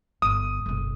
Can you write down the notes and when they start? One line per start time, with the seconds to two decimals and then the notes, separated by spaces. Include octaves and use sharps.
0.22 G1 D#6
0.66 F#1 B1